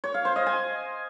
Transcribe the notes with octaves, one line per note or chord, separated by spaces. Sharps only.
C#5
F5
C5
D#5
G#5